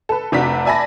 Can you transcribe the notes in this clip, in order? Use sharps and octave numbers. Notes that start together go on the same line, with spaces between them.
A4 B4
F1 C3 D4 F#4 B6
D5 E5 G#5 A5 B5 A#6